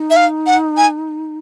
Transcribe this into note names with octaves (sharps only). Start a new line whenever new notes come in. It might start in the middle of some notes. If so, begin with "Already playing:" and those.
Already playing: D#4
E5
F5
F#5
G#5